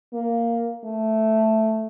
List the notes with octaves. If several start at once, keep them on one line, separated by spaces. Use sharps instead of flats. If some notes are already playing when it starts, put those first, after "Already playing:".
A#3
A3